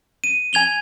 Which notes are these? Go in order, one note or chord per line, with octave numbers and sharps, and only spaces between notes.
D#7
G#5 G#6 F7 G7